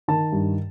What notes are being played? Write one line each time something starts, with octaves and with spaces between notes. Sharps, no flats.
D#3 A5
G2